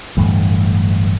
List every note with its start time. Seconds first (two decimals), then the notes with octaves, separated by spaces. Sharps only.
0.17 D1 G2 E3 A3